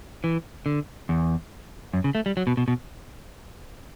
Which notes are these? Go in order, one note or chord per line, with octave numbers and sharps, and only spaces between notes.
E3
D3
E2
F#2
C#3
A3
G3
F#3
B2
B2
B2